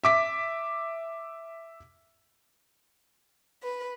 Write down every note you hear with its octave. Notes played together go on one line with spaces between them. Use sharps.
E5 D6 B6
B4